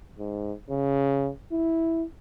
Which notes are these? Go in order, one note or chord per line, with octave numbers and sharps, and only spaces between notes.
G#2
C#3
E4